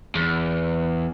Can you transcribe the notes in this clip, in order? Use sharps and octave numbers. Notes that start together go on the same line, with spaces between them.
E2